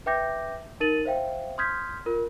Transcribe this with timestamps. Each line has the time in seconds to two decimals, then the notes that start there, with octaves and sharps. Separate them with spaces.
0.06 B4 E5 G5 D6 G6 A#6
0.80 D#4 A#4 A6 D#7 F#7
1.05 C5 E5 F5 G5
1.58 C6 D#6 F6 G6 G#6 B6
2.06 F4 A#4